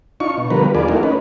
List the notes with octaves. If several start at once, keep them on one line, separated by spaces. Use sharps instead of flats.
D4 D#4 F4 C#6
B2
D3 F3 G3 B3 A#4 B4
D#2 F4 G#4 D5
A3 C4 D#4 E4 F#4 A#4
C#4 D#4 B4